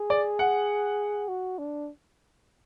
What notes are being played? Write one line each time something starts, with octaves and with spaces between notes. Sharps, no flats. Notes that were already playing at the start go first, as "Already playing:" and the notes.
Already playing: G#4
D5
F#5
F#4
D4